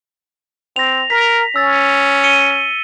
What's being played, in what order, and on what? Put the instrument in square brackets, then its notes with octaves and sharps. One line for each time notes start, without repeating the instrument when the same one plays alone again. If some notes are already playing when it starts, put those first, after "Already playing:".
[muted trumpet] C4 [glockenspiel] A#6 F7
[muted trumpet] A#4 [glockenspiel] B6
[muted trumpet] C#4 [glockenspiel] E6 A6
[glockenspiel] C#7 D#7 G7